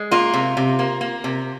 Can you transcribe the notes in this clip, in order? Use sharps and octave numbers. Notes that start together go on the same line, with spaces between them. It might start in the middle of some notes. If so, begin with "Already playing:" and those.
Already playing: G#3
A#3 F4
C3
C3
A#3
A#3
C3